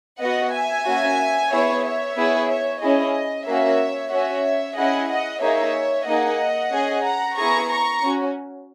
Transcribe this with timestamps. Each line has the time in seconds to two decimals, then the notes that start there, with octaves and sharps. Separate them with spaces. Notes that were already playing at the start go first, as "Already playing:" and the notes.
0.20 B3 F#4 D#5 F#5
0.53 E5 G#5
0.86 A#3 C#4 F#4
1.50 B3 E4 G#4 C#5 E5
1.83 C#5 E5
2.16 B3 E4 G#4
2.48 C#5 E5
2.81 C#4 E4 G#4 D#5
3.46 A#3 C#4 F#4 C#5 E5
4.11 C#4 F#4 C#5 E5
4.76 C#4 E4 G#4 D#5 F#5
5.09 D#5 F#5
5.42 A#3 D#4 G#4 C#5 E5
6.07 A#3 D#4 G#4 D#5 F#5
6.72 C#4 G#4
7.05 F#5 A#5
7.37 B3 E4 G#4 A#5 C#6
7.70 A#5 C#6
8.03 C#4 F#4